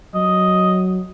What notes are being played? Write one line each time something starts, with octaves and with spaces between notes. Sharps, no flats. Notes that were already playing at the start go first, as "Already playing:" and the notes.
F#3 D#5